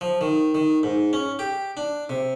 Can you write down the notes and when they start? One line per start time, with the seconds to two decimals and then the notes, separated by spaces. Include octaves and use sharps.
0.01 F3
0.21 D#3
0.55 D#3
0.83 G#2
1.13 C#4
1.39 G4
1.77 D4
2.09 C3